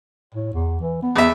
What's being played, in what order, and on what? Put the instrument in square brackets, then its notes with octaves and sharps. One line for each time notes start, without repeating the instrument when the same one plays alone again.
[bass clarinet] A2
E2
E3
B3
[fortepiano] E2 E5